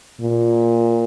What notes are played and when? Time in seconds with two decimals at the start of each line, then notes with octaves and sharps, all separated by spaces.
0.21 A#2